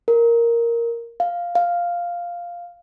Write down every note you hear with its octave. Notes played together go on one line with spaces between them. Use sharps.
A#4
F5
F5